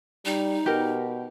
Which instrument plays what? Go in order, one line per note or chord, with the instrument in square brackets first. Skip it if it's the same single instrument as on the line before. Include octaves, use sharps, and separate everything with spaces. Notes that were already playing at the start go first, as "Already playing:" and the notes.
[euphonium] G3 [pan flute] D#4
[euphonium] B2 [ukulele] G4 A#4